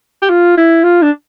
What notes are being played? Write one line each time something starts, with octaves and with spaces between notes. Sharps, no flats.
G4
F4
E4
F4
D4